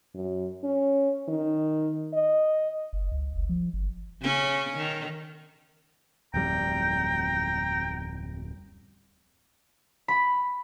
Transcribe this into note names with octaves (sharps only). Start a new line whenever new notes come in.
F#2
C#4
D#3
D#5
F#1
C#2
F#1
F3
G1
C#3 C#4
D#3
D1 F2 G3 G5 A#5
B5